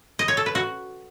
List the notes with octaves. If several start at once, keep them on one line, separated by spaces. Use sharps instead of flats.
D#5
C#5
A4
B4
F#4